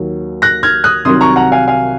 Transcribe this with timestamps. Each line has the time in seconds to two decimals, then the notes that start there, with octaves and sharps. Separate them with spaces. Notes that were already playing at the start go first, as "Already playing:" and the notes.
Already playing: D#2 D#3 F#3
0.42 F#6 A#6
0.63 F6 G#6
0.84 D#6 F#6
1.05 C2 C3 D#3 F#3 C6 D#6
1.20 A#5 C#6
1.36 F#5 A#5
1.52 F5 G#5
1.68 F5 G#5